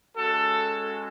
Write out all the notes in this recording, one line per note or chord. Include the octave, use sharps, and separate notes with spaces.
G#3 C#4 F#4 A4